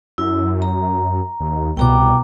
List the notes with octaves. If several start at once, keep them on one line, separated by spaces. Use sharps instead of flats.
F#2 E4
A#5
D#2
C2 B2 G5 A#5 D6